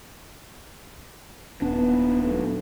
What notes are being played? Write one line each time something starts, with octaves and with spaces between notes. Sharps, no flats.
D#1 B3 D4
F#3 A3